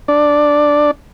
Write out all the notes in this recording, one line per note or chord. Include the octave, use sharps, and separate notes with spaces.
D4 D5